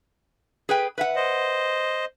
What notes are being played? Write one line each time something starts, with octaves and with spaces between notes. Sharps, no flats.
G#4 B4 G5
B4 E5 F#5
C5 D#5